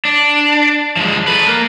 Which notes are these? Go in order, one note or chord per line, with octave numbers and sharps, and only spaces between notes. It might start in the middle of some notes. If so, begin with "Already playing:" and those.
D4
F3 G#3
A4 B4
A#3